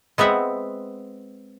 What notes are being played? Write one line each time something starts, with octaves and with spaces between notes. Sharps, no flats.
G#3 B3 C4 E5 F#5